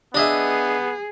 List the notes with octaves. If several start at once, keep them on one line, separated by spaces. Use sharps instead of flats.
B3 D4 G#4 D#5 E5